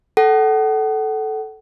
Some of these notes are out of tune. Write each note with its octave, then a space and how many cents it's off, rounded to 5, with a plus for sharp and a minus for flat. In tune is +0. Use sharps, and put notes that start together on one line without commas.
A4 -10 F#5 +30